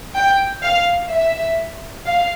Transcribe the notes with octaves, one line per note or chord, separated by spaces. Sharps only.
G5
F5
E5
F5